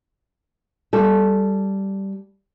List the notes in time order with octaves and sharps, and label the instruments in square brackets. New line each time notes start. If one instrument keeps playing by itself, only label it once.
[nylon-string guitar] G3 A4